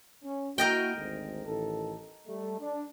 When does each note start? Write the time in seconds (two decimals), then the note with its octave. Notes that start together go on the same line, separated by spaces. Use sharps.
0.24 C#4
0.58 A#3 E4 F#4 A#4 D#5 G5
0.95 G#1 D2 G#2
1.46 A1 D#3 A4
2.27 G3 A3
2.60 D4